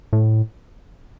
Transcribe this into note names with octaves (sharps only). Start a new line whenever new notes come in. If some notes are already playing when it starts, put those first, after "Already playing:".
A2